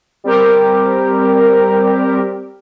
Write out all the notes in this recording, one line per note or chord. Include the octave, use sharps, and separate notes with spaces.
G3 C4 G4 A#4